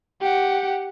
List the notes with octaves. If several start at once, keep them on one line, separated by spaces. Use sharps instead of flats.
G4 F#5